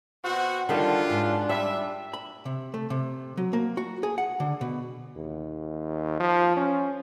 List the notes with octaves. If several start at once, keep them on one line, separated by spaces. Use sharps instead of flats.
B2 C4 F#4
F#2 D3 D#3 G3 D4 F4
G#2
G3 E5
B5
C3
A3
C3
F#3
A#3
F#4
G#4
F#5
D3
B2
D#2
F3
C#4